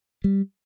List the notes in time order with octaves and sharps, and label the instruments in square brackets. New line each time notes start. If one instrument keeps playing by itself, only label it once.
[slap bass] G3